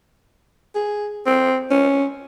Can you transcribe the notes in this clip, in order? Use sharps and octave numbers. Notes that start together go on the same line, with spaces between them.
G#4
C4
C#4